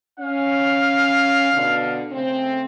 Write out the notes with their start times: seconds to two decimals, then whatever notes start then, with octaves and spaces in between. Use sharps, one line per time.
0.20 C#4 F5
1.53 B2 D3
2.12 C#3 A3 C4